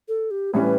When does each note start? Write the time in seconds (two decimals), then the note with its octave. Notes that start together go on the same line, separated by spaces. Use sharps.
0.08 A4
0.31 G4
0.53 A2 E3 G3 C#4 B4